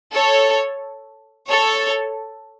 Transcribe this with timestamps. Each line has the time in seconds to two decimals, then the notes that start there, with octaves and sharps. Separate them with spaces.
0.14 A4 C#5
1.48 A4 C#5